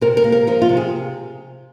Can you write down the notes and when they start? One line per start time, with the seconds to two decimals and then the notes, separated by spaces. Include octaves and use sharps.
0.01 C3 A#4
0.17 A#4
0.24 A#3
0.32 A#4
0.47 F3 A#4
0.62 F4
0.69 C3
0.77 G#4